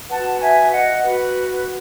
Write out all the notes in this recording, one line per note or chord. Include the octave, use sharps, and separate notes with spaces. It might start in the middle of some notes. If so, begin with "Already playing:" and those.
F#4 B4 F#5 A5
E5 G#5
D#5 F#5
F#4 B4